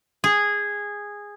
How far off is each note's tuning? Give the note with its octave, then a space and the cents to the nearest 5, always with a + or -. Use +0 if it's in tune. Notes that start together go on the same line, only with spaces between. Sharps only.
G#4 -10